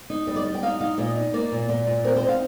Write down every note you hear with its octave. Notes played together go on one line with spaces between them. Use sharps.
D#4
G3 D#5
D5
G3 D#5
G5
D#4 F5
D#4 F5
A#2 D#5
D#4
A#3 D5
A#2
A#2
A#2
C4 A#4
C5
D#4
F5